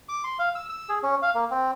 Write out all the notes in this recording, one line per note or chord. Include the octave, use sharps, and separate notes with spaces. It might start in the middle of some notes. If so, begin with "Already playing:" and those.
D6
C6
F5
E6
E6
G#4
C#4
F5
A#3
C4